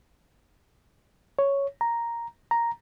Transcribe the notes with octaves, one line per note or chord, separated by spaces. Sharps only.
C#5
A#5
A#5